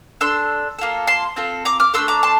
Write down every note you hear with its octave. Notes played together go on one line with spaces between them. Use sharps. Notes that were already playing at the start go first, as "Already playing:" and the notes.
D4 A4 C6 E6
A#3 F4 A4
A5 C6
C4 F4 A4
A#5 D6
D6 F6
A3 D4 A4 C6 E6
A#5 D6
A5 C6